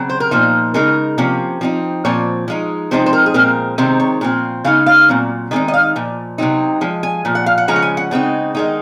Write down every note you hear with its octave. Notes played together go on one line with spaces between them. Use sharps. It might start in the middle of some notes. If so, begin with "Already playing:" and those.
Already playing: C#3 F#3 C4
C5
A#4
A#2 F3 A#3 D#4 C5
C#3 G#3 D#4 A#4
C3 F3 A#3 C#4
F3 C4 D#4
A#2 F3 C4 C#5
F3 G#3 D#4
C3 F3 G#3 C4 D#4 C5
C5
A#4
G#4
A#2 F3 G#3 C4 A#4
C3 D#3 G#3 C4 D#4 C5
C#5
A#2 F3 C4
C#3 G#3 D#4 F5
F5
A#2 F#3 C4
D#3 G#3 C4 D#4 D#5
D#5
F5
A#2 F3
C3 F#3 C4 D#4
F3 G#3
G#5
A#2 F3
F#5
F5
F#5
C#3 F3 G#3 C#4 A#5
F#5
G#5
F#5
C#3 G#3 C4 D#4
D#3 G#3 D#4